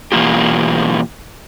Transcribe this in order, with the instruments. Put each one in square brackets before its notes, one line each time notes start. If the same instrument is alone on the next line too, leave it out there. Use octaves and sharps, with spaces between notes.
[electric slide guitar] B2 E3 A#3 F4 G4